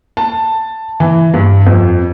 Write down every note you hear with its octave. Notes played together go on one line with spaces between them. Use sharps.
A5
E3
G2
F2